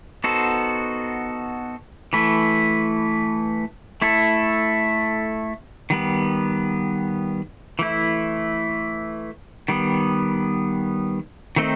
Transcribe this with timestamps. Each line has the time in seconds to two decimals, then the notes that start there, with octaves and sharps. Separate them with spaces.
0.24 B3 D#4 F#4 A4 C5
2.13 E3 A3 E4 B4
4.02 A3 E4 A4
5.90 D#3 G3 B3
7.79 E3 A3 E4
9.68 D#3 G3 B3
11.56 D#3 A3 C4 D#4